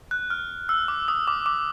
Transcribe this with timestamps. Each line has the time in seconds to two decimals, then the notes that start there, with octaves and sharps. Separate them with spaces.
0.11 F#6
0.30 F6
0.69 E6
0.88 D6
1.08 D#6
1.27 D6
1.46 D6